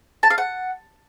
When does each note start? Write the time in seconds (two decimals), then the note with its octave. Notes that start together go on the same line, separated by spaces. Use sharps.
0.23 A5
0.30 F5
0.38 F#5